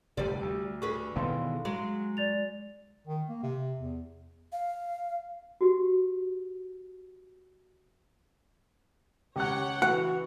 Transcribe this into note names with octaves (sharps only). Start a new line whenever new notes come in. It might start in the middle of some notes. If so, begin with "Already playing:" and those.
F1 D2 C3 G3 D5
D2
D3 G#4 B4 C#6
B2 D#3 E3 F5 C6
F#3 G#3
D5 A6 F7
D#3
A#3
C3
E2
F5
F#4 G4
C#2 G4 C#5 F#5 G5 F#6
E3 F#4 F#5